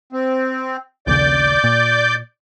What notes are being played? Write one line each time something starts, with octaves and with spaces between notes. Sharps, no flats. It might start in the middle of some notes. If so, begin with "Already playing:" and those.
C4
A#1 D#2 C#3 D5 D6 G6
A#2